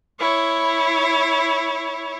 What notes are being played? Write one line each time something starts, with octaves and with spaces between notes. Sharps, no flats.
E4 C#5